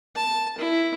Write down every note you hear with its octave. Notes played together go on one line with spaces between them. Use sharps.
A5
E4